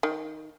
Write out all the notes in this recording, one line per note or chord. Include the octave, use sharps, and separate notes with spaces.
D#3